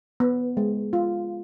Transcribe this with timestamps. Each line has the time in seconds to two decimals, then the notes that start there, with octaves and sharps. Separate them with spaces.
0.20 B3
0.57 G#3
0.93 F4